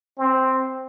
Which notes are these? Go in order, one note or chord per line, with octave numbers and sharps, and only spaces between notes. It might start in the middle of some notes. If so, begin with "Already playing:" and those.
C4